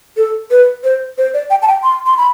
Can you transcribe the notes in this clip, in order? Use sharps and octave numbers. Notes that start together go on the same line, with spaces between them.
A4
B4
C5
C5
D5
G5
A5
G5
C6
C6
B5